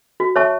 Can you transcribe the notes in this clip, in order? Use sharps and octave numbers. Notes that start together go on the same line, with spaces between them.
F#4
C#5 E5 A5 C#6